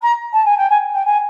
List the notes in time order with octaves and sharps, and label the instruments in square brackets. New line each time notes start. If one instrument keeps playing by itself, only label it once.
[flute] A#5
A5
G#5
G5
G#5
G5
G#5